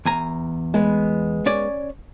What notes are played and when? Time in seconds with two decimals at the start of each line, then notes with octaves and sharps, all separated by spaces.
0.05 E2 G#5 A#5
0.74 G#3 B3
1.46 C#4 C#5 D5